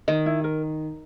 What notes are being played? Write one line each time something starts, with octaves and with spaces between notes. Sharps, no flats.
D#3 D#5
E4
A#4